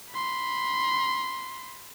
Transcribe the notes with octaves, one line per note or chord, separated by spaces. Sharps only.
B5 C6